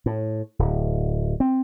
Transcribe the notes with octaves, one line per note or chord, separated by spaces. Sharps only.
A2
D1
C4